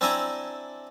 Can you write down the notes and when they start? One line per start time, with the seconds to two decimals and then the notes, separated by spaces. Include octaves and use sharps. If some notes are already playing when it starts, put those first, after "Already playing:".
0.01 C4 D4 E4 E5 G#5 A#5